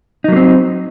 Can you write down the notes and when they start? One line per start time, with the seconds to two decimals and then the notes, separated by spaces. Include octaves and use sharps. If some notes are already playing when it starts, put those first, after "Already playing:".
0.24 D#4
0.28 F#3
0.32 A#3
0.36 C4